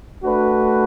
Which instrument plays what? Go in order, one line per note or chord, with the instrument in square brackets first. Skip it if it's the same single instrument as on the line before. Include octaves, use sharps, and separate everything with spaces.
[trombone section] A3 D4 F#4 B4